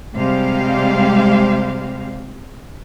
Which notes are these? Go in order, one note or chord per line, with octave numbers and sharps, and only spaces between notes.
C3 G3 G#3 G4 C5 F5